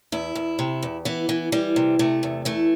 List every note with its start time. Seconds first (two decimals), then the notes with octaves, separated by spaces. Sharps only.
0.12 E2 E4
0.35 E2
0.59 C3
0.83 E2
1.05 E3 B3
1.29 E3
1.52 E3 G3
1.76 C3
1.99 C3 A3
2.23 E2
2.45 E3 A3